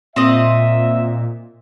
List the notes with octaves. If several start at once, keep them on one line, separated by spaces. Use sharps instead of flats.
A#2 C4 D#5 E5